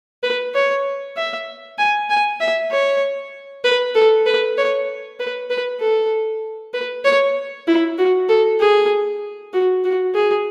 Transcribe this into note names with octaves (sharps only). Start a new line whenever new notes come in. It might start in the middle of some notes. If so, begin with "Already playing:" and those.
B4
C#5
E5
G#5
G#5
E5
C#5
B4
A4
B4
C#5
B4
B4
A4
B4
C#5
E4
F#4
A4
G#4
F#4
F#4
G#4